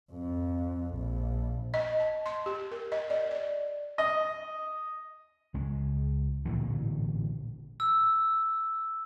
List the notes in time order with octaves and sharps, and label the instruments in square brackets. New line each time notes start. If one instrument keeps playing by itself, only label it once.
[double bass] F2
A#1
[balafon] D#5
A5
C6
G4
A#4
D#5
D5
D5
[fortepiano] D#5
[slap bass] C#2 G#3
A1 A#2 D3 E3
[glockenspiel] E6